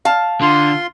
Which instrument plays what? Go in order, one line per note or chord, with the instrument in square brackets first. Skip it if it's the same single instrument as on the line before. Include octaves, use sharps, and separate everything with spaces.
[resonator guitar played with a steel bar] F5 A5
[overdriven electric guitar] D3 [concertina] F4 C6